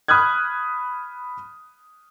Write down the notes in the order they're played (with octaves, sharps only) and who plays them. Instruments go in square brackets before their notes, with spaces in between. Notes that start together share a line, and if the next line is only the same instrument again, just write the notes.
[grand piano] B5 D#6 F6 F#6 G#6